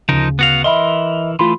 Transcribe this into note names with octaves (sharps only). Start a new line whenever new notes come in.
D2 C#3 F3 D#4 A#4
B3 F#4 F5
E3 A#4 D#5 E5 B5 C6
E3 A3 F4 B5 C6